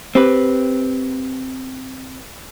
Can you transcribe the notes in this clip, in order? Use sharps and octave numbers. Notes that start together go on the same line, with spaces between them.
C4 G4 B4